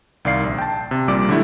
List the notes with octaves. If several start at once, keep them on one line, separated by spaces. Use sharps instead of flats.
C2 D#3 D5 F5 C7
A#1
G5 A5
C3
A#1 A#2 G3 D5 D6 D7
D3 F#3 G3 A3 E4